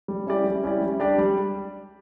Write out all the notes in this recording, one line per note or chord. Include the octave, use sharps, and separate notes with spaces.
G3
C#4 E4 G4 D5
G3
C#4 E4 G4 D5
G3
D4 G4 D5
G3